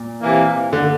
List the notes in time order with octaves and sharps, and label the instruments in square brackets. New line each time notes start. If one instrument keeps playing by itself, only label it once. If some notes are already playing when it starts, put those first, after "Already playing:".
Already playing: [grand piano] A#2
[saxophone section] C3 E3 A#3
[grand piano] D3